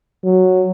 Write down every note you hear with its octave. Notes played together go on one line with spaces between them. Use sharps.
F#3